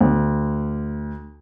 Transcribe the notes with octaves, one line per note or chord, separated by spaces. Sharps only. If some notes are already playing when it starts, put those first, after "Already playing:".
D2